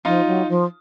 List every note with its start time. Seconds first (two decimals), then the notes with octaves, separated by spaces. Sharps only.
0.05 F3 D#4 F4
0.27 F#3
0.49 F3